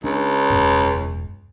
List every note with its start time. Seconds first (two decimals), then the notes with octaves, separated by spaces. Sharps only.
0.04 C#2 D4
0.50 E1 F#2